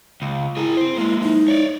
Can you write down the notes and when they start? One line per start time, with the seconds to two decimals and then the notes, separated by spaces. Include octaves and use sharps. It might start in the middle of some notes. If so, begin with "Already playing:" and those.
0.22 C#2
0.57 E4 G#4 A#4
0.77 C4 C5
0.96 G#3 A#3 E4
1.22 D#4
1.48 C#5 D5